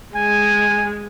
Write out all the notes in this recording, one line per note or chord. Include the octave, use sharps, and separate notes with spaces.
G#3 G#5